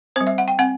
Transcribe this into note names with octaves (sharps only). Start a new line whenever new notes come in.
G3 C4 C5
E5
F#5
G5
C4 F#5